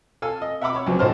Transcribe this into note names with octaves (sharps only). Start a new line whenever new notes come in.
A4 F5 G#5 E6
D#5
E5 F#5 A#5 B5 D6 E6
C#5 B5
C#2 F#3 C4
A1 A2 D#4 C5 A5 F6